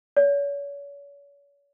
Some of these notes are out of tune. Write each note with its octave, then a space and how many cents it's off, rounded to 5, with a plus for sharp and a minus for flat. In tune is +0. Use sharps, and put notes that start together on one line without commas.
C#5 +40